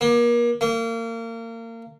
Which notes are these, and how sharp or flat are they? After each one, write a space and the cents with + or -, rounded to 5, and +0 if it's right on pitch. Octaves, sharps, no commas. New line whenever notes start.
A#3 +35
A#3 -30